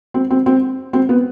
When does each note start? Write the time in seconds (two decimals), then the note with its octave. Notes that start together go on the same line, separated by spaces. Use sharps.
0.14 C4
0.30 C4
0.46 C4
0.93 C4
1.09 B3